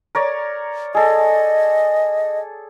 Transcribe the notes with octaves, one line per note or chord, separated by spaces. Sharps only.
A#4 C#5 D5
G#4 A4 D#5